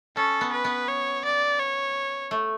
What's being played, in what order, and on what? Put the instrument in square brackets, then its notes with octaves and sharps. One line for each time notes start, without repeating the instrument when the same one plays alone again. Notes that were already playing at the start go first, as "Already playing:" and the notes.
[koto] C#4 [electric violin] A4
[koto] B3
[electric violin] B4
[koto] B3
[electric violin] C#5
D5
C#5
[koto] A3